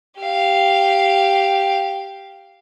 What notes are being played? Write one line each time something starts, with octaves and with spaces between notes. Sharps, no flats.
G4 F5